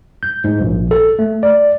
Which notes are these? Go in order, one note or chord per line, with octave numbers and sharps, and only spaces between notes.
G6
G#2
A#1
A4
A3
D5